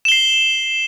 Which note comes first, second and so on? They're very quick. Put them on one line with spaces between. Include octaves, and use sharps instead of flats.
E7 G7 C7